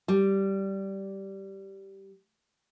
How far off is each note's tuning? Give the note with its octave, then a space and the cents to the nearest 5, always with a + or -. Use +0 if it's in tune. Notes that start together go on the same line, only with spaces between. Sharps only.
G3 -10